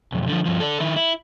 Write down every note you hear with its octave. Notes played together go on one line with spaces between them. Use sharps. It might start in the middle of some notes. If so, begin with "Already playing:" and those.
B1 F2
D3 F3
G2 F3
A4 D5
D#3 E4
E4